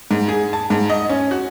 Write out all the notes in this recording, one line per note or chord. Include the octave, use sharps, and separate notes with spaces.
G#2
G#4
A5
G#2
D#5
C#4
F#4